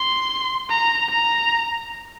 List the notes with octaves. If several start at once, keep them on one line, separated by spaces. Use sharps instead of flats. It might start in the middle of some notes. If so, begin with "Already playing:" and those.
Already playing: C6
A#5
A#5